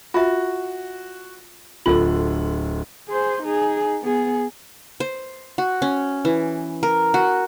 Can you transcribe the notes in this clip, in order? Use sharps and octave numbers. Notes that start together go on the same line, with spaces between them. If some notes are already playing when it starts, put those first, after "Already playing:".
F4 F#4 E5
D1 D3 F4 A4 F#7
G#4 C5
D#4 G#4
B3 G#4
C5
F#4
C#4
E3
A#4
F#4